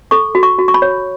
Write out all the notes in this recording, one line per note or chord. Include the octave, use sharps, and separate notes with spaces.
A4 C#6
F#4
C#6
F#4
C#6
B5
C#5